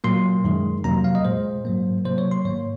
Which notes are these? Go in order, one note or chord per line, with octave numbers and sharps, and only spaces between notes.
A#2 F#3 A#3 C6
F#2 D#3 G#3
F2 C3 F#3 A#3 A#5
F5
D#5
A#2 G#3 C5
G#2 F#3 A#3
C3 F#3 A#3 C5
C#5
C6
G#2 D#3 A#3 C#5